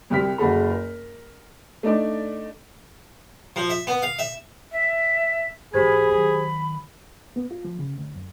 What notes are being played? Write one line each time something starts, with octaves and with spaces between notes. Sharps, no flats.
C2 C3 G3 F6 B6
F#1 F#4 G#4 A4 B5
A#4
A3 D4 D#4 D5 D6
F3
E5
B3
F5
E5
E5
G#2 E3 G4 G#4 C5 B5 G#6
D#3 F#3 B5
B3
F4
F3
C#3
D2
F#2